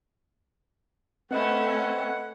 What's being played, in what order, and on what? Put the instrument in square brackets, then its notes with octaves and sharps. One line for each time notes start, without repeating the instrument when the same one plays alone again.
[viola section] A3 C#4 [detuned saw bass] C4 [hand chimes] B4 D#5 B5 [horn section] F#5